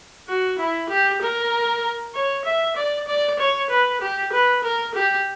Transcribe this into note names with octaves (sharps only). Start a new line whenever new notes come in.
F#4
E4
G4
A#4
C#5
E5
D5
D5
C#5
B4
G4
B4
A#4
G4